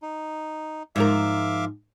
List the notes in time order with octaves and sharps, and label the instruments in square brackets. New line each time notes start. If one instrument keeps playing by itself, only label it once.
[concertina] D#4
[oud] G#2 F3 A#4 [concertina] E5 F5 D6